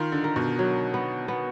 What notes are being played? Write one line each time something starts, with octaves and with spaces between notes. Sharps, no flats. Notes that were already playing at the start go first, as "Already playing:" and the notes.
Already playing: D#3 F4
D3
A#4
B2
F#3
B3
B3